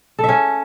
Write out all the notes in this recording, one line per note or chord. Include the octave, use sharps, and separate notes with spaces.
A4
E5
C#4